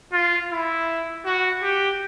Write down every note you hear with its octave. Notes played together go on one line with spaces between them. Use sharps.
F4
E4
F#4
G4